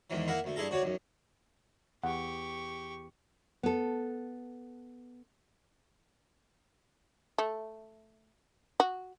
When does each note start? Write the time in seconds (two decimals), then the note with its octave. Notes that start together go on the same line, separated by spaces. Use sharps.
0.10 E2 G#2 D#3 E3
0.28 A#3 E4 A#4 E5 F#5
0.44 D2 A3
0.56 G2 E4 G#4 A4 A#5
0.70 D2 F#4 C#5 D5
0.82 B1 F#2
2.03 E2 G4 F#5 C#6
3.63 B3 A4
7.38 A3
8.80 F#4